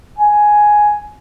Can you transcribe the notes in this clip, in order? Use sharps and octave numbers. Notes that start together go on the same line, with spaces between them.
G#5